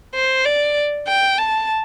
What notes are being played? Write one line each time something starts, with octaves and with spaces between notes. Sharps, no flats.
C5
D5
G5
A5